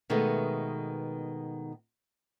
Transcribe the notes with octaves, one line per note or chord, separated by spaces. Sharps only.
B2 D#3 G#3 A3 B3